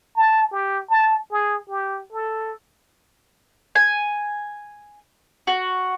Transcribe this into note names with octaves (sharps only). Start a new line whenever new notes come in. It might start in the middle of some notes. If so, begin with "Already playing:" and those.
A5
G4
A5
G#4
G4
A4
G#5
F#4